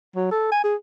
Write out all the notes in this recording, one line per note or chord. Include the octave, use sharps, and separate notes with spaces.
F#3
A4
G#5
G#4